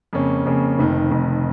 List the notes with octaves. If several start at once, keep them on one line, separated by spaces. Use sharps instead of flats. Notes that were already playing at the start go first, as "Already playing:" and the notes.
F2 C#3 A#3 C#4
F2 C#3 A#3 C#4
F1 F2 D#3
F1 F2 D#3